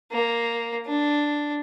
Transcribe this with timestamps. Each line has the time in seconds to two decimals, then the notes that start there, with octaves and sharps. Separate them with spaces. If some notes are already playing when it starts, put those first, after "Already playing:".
0.12 A#3
0.86 D4